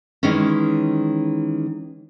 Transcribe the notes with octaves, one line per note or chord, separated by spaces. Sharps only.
D#3 E3 G#3 C#4